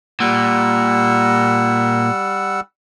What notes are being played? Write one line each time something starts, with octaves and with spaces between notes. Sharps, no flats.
A#2 G3 F#5 E6